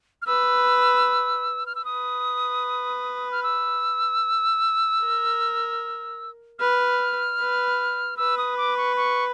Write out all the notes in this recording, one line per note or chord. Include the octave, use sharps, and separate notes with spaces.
F6
B4 E6
F6
E6
B4 D#6
F6
E6
A#4
B4 F6
B4
B4 E6
D#6
D6
C#6
C#6